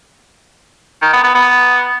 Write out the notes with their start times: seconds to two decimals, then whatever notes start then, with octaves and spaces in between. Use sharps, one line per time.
1.02 D#3
1.13 B3
1.24 B3
1.35 B3